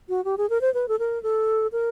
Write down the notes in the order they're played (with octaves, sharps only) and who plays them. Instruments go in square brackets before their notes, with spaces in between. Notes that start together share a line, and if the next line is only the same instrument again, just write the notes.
[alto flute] F#4
G4
G#4
A#4
C5
B4
A4
A#4
A4
A#4